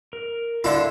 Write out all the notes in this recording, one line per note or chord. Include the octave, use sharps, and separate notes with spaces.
A#4
D3 E4 F5 C6 E6